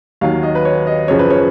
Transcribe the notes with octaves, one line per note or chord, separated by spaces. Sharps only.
D#2 D#3 F#3 F5
D#5
B4
C#5
D#5
F#2 C#3 F3 C#5
B4
C#5